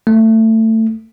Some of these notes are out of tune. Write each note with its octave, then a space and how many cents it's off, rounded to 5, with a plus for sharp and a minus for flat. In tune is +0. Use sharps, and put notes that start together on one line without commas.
A3 +20